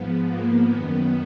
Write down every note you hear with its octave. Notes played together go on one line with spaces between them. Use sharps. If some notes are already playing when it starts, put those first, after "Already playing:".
Already playing: G#2 F3 B3
A#3
F#2 D#3 B3